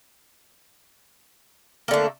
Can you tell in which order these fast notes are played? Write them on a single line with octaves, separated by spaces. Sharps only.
A#3 D3 A3